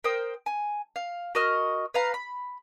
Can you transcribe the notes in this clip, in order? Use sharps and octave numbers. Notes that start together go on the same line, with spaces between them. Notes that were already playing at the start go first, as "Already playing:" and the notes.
A#4 C5 G5 D#6
G#5
F5
F#4 A#4 D#5 F6
B4 F5 A#5
B5